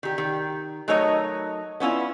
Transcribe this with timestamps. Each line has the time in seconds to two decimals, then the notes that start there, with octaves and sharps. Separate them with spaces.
0.03 D#3 G4
0.18 D#3
0.88 F#3 A3 D#4 A#4 C#5 D#5
1.80 B3 C#4 E4 F4